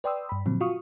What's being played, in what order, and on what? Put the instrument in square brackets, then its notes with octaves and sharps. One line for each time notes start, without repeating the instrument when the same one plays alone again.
[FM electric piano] B4 D5 G5 C6 D#6 E6
G2 B5
A#2 D3 F3 F#3 C4
F4 F#4 F5 C#6 D#6